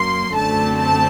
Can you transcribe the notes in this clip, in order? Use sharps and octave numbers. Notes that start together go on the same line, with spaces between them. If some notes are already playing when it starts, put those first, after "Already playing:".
Already playing: F#2 F#3 A#3 C6
F#2 D3 A3 C4 A5
A5